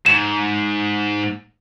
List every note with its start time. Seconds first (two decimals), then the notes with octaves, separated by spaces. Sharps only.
0.06 G#2 E7